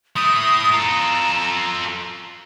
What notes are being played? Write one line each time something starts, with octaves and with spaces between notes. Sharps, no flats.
A3 E4 D#6
F4 A4 A#5